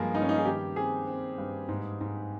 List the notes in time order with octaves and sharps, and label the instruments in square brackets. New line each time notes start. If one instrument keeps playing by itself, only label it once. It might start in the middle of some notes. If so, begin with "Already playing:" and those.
Already playing: [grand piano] G2 G3 [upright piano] F3 G#3 A#3
[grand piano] G2 [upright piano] D#4
[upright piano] C#4
D#4
G#4
[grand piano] D#3 [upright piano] G4
[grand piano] C4 [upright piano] G#4
[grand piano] C4
G2
G#2
G#2